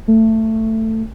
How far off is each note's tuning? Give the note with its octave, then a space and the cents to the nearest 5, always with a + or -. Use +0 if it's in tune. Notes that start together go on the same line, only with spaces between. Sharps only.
A3 +15